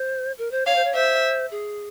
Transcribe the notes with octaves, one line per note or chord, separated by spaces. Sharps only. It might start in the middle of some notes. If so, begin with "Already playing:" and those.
Already playing: C5
A#4
C5
C#5 F5
C5
C#5
C5 E5
G#4